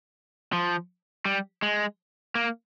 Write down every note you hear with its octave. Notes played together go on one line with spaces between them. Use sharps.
F3
G3
G#3
A#3